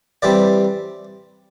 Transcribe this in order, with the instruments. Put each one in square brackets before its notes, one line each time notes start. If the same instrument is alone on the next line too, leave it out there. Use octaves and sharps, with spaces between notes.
[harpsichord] E3 G3 C4 D5